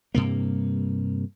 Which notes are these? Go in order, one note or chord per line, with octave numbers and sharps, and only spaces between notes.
G2 C3 A#3